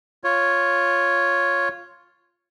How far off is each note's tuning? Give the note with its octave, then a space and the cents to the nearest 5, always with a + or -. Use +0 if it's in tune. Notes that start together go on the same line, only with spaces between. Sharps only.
F4 +0 C#5 +0